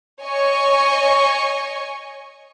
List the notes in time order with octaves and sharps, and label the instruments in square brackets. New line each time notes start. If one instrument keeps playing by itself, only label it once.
[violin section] C#5 D#5 G#5 C#6